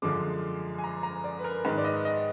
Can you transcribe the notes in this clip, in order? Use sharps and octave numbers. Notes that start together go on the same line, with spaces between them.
F#2 D3 F3 G#3 D6
G#5
A#5
A#5
D5
B4
A#4
G#2 D#3 G#3 B4
D5
D#5
D#5